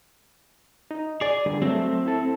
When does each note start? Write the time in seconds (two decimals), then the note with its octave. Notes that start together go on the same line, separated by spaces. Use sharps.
0.91 D#4
1.21 G#4 D5 D6
1.46 D3 G3 G#4
1.62 F#3 A3 C4
2.06 E4 A4